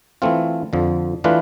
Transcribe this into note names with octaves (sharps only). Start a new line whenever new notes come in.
E3 A3 C4 F4
F2 D3 F3
E3 A3 D4 F4 B4